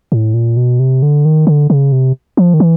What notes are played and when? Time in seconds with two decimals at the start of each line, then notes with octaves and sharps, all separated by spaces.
0.12 A2
0.34 A#2
0.57 B2
0.79 C3
1.02 D3
1.25 D#3
1.47 D3
1.70 C#3
1.92 C3
2.37 F3
2.54 D#3
2.60 E3